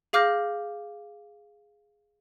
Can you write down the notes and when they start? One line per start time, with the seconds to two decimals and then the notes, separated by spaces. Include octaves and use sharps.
0.13 G#4 F5 D6 F6 G6 A#6